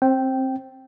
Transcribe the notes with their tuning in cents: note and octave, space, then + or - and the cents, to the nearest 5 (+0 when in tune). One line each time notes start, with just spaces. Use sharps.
C4 +20 G5 -10